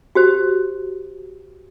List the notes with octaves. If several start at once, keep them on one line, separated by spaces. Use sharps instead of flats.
F#4 G4 C5